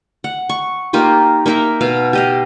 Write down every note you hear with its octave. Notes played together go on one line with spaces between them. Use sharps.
F#5
C#6
A#3 D#4 F4 G4
A#3 D#4 A#4 E5
B2 F5
G4 D#5 F5